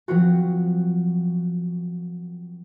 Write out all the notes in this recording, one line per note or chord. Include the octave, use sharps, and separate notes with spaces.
F3 F#3 C4 F4 F#4